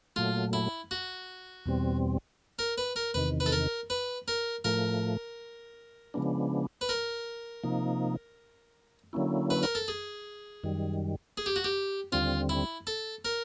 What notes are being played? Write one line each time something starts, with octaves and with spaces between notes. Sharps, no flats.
A#2 F#3 A3 F4
E4
F#4
E2 B2 G3 C4
A#4
B4
A#4
E2 C3 D#3 B4
B4
A4
A#4
B4
A#4
A2 F3 A3 A#4
C#3 F3 G#3 B3 D4
B4
A#4
C3 F3 A#3 D#4
D3 F#3 A#3 C#4 E4
B4
A#4
A4
G#4
F#2 D#3 G3
G#4
G4
F#4
G4
D#2 D3 G3 C4 F4
E4
A4
A#4